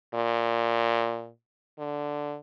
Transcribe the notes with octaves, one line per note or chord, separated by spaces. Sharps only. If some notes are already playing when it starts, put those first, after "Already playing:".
A#2
D3